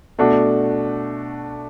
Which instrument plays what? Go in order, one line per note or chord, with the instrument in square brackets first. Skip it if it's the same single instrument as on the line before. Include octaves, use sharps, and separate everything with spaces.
[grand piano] B2 A3 D4 F#4